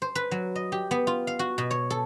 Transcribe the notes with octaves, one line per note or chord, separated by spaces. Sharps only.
C5
B4
F#3
D#5
G4
B3
F4
F5
F#4
B2
C#5
A4